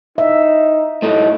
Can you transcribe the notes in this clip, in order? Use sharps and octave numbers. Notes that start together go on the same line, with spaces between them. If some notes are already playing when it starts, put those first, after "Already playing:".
D#4 E5
A2 A3 D#4 D#5